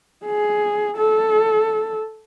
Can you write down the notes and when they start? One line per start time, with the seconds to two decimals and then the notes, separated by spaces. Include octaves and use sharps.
0.26 G#4
0.97 A4